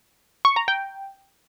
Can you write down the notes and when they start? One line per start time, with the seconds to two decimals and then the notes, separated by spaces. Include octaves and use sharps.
0.45 C#6
0.56 A#5
0.68 G5